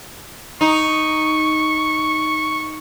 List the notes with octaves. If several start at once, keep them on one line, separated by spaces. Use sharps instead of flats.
D#4 C#6